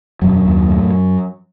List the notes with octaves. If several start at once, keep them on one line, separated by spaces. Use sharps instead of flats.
E1 F#2 F#3
D#2
A2